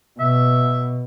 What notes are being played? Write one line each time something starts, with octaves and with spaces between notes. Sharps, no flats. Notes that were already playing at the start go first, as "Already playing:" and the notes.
B2 E5